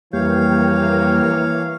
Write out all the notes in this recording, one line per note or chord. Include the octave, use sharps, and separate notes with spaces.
F2 E3 G3 A#3 C#5 F5 G5